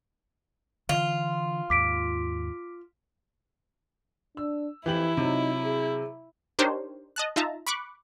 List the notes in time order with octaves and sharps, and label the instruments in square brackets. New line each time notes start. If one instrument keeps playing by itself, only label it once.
[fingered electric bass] D3 E3 [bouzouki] F4
[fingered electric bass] D#2 G#2 [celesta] D6 B6 D7
[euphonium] D4 [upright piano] E6
[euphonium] F2 [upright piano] E3 G4 F#7 [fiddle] E4
[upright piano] C3 F#3 [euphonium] D#4
[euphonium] G#4
[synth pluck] D4 D#4 G4 A#4 C5 C#5
D#5 A5 F#6
D#4 F4 E5 A5 A#5
B5 C#6 D6 F#6